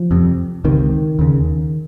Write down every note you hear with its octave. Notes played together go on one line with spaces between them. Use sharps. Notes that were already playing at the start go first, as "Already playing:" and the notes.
Already playing: F3
F2 C3
C#2 C3 D#3
D#2 C#3